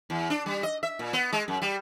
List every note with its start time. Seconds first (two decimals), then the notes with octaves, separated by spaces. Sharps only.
0.10 E2
0.30 D4
0.46 G3
0.63 D#5
0.83 E5
0.99 A#2
1.13 B3
1.33 G#3
1.48 F#2
1.62 G3